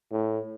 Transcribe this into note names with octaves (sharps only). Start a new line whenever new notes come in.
A2